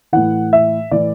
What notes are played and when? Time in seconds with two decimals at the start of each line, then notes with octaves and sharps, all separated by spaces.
0.12 A2 E3 F#5
0.53 E5
0.91 A2 E3 D5